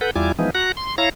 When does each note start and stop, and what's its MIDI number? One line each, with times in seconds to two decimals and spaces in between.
0.01 0.11 69
0.01 0.11 71
0.01 0.11 78
0.01 0.11 91
0.16 0.32 40
0.16 0.32 55
0.16 0.32 64
0.16 0.32 65
0.16 0.32 80
0.16 0.32 86
0.39 0.50 52
0.39 0.50 53
0.39 0.50 56
0.39 0.50 59
0.39 0.50 63
0.55 0.72 66
0.55 0.72 78
0.55 0.72 82
0.55 0.72 90
0.77 0.96 84
0.98 1.09 64
0.98 1.09 73
0.98 1.09 77
0.98 1.09 82
0.98 1.09 94